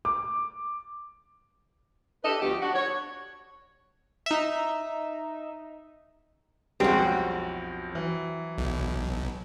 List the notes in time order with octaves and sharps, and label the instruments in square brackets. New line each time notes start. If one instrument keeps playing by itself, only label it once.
[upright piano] D6
[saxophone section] D4 G4 A4 B4 D#5
D2 F3 A3 B3 G4
D4 F#4
C#5
[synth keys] D#4 E5
[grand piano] B1 F2 [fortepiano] G3 G#3 C#4 [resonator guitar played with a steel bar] C4 F#4
[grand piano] E3 F#3
[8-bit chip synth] B1